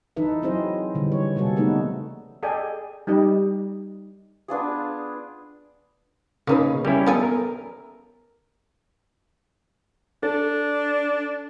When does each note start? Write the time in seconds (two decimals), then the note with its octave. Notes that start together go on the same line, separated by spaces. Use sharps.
0.16 E3 D#4 A4 B4 E5
0.42 F#3 C4 E4 G#4 C5 D#5
0.95 D3 E3 G3
1.12 C#5
1.36 C3 G3 A#3 F#4 G#4 A4
1.56 C#3 A3 B3 D#4 B4
2.43 G#4 A4 D5 D#5 G5 G#5
3.07 G3 D#4 G4 D#5
4.48 B3 D4 F4 G#4
6.47 C#3 A#3 D#4 B4
6.85 G3 A#3 C#4 E4
7.06 B3 A4 G#5
7.23 A#4
10.23 D4 A4